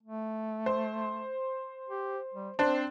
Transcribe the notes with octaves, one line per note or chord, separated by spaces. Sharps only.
A3
C5
G4
G3
C4 D4 C5